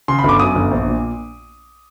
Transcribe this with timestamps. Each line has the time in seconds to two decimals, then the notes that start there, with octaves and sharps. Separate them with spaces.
0.08 C#3 C6
0.19 G1 B5
0.29 D6
0.39 F#2 D#6
0.55 G1
0.71 A#1
0.87 A#2